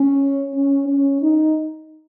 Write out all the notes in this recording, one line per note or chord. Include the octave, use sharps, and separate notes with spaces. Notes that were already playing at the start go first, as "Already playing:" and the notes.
Already playing: C#4
C#4
C#4
D#4